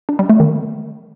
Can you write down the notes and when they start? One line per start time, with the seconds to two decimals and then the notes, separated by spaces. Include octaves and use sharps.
0.09 D4
0.19 G3
0.29 A3
0.40 D#3